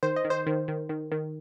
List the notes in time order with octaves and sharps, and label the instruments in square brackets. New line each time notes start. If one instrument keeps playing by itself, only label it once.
[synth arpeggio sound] D#3 C5
D#5
D#3
C5
D#3
D#3
D#3
D#3